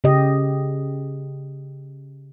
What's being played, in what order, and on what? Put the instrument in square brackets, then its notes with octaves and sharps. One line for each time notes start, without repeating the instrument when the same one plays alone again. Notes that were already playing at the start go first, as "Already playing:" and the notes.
[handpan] C#3 G4 D#5